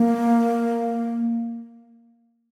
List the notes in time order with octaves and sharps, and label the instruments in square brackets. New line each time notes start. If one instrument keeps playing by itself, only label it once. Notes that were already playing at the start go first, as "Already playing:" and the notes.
Already playing: [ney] A#3